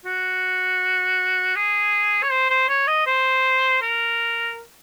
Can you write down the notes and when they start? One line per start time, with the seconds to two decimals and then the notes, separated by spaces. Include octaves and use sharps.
0.05 F#4
1.55 G#4
2.23 C#5
2.32 C5
2.50 C5
2.69 C#5
2.87 D#5
3.06 C5
3.82 A#4